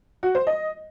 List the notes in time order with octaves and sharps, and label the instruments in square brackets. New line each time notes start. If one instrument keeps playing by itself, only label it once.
[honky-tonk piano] F#4
C5
D#5